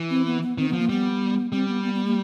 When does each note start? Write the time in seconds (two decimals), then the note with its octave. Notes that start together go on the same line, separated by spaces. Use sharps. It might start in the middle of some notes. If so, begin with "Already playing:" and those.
Already playing: E3
0.10 C4
0.26 B3
0.42 B3
0.58 D#3 C4
0.69 F3 B3
0.79 A#3
0.89 G3 B3
1.52 G3 C4
1.68 B3
1.84 B3
1.94 B3
2.05 A#3